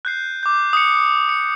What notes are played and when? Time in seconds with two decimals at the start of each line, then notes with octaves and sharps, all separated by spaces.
0.05 F#6 G6 C7
0.43 D6 G6
0.73 D#6 C#7
1.29 C#7